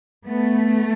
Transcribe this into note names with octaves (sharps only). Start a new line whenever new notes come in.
A3 B3